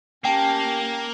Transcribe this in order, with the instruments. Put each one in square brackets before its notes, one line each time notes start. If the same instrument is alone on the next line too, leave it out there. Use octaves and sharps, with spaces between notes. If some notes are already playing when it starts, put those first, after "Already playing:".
[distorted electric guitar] A#3 [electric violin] C#4 G4 [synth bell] G5 [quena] A5